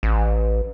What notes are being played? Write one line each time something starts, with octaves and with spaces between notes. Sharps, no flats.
A1